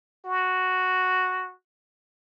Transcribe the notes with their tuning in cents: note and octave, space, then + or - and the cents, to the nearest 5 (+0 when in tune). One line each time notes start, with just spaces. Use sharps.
F#4 +0